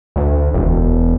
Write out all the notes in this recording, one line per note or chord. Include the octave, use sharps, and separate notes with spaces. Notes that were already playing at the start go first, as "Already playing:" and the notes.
D2
E1